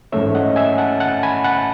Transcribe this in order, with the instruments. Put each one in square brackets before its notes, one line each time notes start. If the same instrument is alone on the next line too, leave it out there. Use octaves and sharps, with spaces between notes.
[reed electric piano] G#2 E3 A3 C#4 C#5 E5
D#5 F#5
E5 G#5
F#5 A5
F#5 A5
G#5 B5
F#5 A5